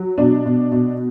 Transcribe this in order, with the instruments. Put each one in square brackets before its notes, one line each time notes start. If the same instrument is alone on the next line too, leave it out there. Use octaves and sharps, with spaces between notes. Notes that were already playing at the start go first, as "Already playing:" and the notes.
Already playing: [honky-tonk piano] F#3
B2 D4
B2
B2